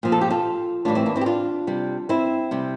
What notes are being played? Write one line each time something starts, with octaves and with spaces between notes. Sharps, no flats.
A#2 F3
A4
G4
F4 A4
A2 E3 G3 D4 F4
C4 E4
A#3 D4
C4 E4
G4
D4 F4
C3 G3
C4 E4
C3 G3